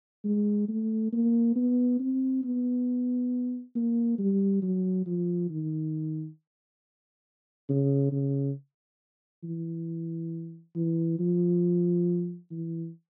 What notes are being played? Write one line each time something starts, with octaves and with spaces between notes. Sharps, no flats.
G#3
A3
A#3
B3
C4
B3
A#3
G3
F#3
F3
D#3
C#3
C#3
E3
E3
F3
E3